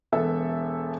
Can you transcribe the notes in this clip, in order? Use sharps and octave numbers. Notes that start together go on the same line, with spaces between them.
E1 B3 A4 E5